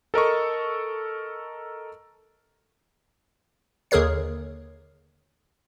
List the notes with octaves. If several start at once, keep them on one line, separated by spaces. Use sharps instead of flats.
A4 A#4 D#5 C#6
D#2 D3 G#4 A#4 C#5 C7